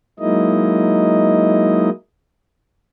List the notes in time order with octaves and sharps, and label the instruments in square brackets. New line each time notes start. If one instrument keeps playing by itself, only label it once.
[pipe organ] F#3 G#3 A#3 D#4 E4 D#5